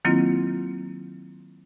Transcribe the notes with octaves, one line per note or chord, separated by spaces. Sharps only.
D#3 F#3 A#3 C4 E4 F4